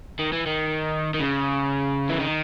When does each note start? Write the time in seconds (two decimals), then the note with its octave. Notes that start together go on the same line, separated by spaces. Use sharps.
0.19 D#3
0.32 E3
0.46 D#3
1.14 D#3
1.20 C#3
2.10 E3
2.20 D#3